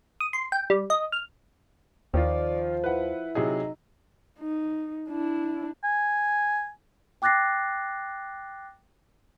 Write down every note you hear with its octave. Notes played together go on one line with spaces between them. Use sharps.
D#6
C6
G5
G3
D#5
F6
D#2 D#3 F3 F4 D5
E4 B4 F#5
C3 F#3 D#4 G#4
D#4
D4 E4
G#5
G5 D6 F#6 A6 A#6 C7